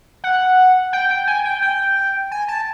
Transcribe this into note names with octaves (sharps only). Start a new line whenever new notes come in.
F#5
G5
G5
G#5
G5
G5
G#5
A5